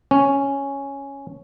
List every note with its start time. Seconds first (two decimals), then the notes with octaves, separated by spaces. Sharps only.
0.11 C#4